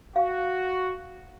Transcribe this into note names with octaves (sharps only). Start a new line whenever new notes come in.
F#4 F5